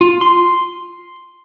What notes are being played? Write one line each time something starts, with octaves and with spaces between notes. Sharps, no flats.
F4
C6